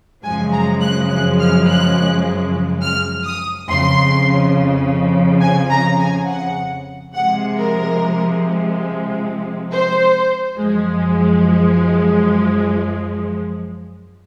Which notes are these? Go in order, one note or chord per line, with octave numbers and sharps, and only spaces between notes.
F#2 C#3 F3 G#3 G#5
A#5
F#6
F#6
F6
F#6
F6
D#6
F2 C#3 F3 C6
G#5
A#5
G#5
F#5
C3 F3 G#3 F#5
A#4
C5
F#2 F3 G#3